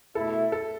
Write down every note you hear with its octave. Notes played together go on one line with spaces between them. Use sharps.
B2 A3 E4 A4
A4